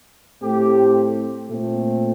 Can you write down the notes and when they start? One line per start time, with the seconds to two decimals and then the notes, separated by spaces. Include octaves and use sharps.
0.43 A2 A3 C4 G4
1.49 A#2 A3 C4